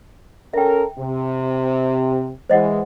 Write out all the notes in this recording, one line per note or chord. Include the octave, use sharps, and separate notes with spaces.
C#4 A4 A#4 E5 G5
C3
E3 G#3 C5 D#5 F#5